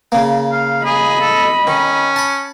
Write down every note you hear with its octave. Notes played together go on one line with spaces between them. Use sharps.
C#3 A#3
F5
G#4 D#5 B5
A4
D#3 C#4
A5 B5